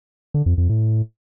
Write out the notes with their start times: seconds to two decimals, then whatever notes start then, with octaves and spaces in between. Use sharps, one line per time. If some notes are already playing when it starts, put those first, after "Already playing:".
0.34 D3
0.46 F2
0.58 F2
0.69 A2